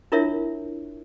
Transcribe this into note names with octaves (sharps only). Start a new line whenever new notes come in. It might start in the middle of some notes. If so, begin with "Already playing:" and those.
D4 E4 F4 A#4 C#5 E5